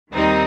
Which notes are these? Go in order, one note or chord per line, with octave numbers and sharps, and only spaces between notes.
D#2 D#3 G3 C4 D#4